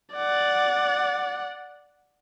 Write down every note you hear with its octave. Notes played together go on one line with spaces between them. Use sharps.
D5 F#5